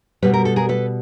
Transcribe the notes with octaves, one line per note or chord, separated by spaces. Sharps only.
B2 G3 B4
A#4
A4
G#4 A#4
A4 B4